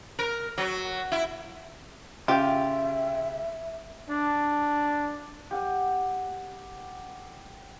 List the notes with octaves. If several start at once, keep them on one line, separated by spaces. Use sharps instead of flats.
A#4
F#3
E4
C#3 F4 G4 E5 G5
D4
G4 F#5 G#5